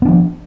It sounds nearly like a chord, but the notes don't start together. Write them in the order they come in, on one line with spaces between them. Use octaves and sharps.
B3 D4 F3